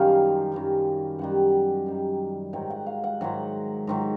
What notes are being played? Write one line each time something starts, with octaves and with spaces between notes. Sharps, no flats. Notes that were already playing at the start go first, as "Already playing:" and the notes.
Already playing: F#2 D#3 G3 F5
F#2 D#3 G3
F#2 D#3 G3 F#5
F#2 D#3 G3
G#2 D#3 F#3 G5
F#5
F5
F#5
G#2 D#3 F#3 F#5
G#2 D#3 F#3